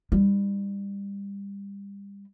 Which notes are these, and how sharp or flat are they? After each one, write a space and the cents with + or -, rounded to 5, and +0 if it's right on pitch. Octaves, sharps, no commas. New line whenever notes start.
G3 +30 D#4 +5